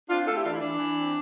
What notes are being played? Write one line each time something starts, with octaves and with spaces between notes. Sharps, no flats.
C4 D4 F4
A3 F4 A4
E4 G4
E3 D4 F4
E4
E3 D4
E3
C4